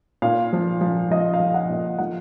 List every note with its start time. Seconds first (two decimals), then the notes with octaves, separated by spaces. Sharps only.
0.22 A#2 F5
0.53 F3
0.81 F3
1.11 F3 D#5
1.34 F5
1.40 F3
1.54 F#5
1.70 A#2
1.99 F3 F#5